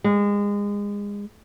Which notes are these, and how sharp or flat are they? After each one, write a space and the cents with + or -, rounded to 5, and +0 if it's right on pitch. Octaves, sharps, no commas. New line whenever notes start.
G#3 -30